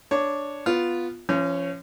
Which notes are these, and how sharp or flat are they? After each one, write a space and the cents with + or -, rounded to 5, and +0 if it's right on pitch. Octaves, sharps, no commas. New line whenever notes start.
D4 +0 C#5 +0
B3 +0 F4 +0
F3 -35 C#4 +0